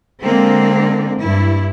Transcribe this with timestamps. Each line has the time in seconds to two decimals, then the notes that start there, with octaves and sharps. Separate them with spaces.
0.23 D3 G#3 A#3 C4
1.20 G2 E4